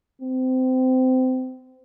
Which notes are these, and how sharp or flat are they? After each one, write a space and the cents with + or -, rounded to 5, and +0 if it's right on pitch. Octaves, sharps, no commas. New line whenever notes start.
C4 -25